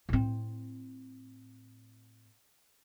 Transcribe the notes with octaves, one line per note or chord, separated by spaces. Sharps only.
A2 C4